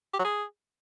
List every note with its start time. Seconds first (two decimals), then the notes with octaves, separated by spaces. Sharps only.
0.14 G4
0.19 F#3
0.24 G#4